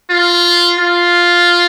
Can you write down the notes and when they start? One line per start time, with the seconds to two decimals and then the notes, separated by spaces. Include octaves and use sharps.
0.10 F4
0.79 F4